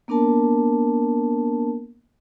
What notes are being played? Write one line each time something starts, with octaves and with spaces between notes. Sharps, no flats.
A#3 B3 D4 A#4 A5